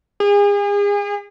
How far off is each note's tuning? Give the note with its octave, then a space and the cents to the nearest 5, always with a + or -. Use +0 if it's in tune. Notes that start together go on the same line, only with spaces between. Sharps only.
G#4 -35